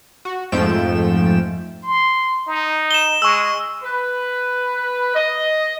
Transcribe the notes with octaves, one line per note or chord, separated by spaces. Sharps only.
F#4
F2 G#2 F3 A3 G5 E7
C6
D#4
E7 G7
G#3 C#6 E6
B4
D#5